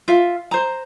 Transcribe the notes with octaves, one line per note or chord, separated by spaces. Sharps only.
F4 E5
C5 A#5